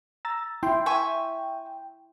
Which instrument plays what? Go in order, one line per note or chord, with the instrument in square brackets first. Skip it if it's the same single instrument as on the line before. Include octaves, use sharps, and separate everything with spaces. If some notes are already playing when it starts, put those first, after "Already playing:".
[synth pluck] A#5 E6 A6
[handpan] E4 [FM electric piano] G5 [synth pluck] C6
[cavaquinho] E5 G#5 C#6